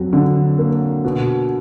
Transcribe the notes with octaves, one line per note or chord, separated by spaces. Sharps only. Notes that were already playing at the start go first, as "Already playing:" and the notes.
Already playing: F2 F#3
D3
A#3
B2